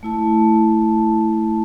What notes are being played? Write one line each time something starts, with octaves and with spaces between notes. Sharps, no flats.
A3 E4 A5